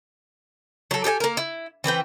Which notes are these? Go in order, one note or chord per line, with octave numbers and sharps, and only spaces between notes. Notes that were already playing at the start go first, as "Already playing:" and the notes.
F#3 A4
G4 A4 D5 G#5
A#3 A#4
E4
E3 C4 B4 G5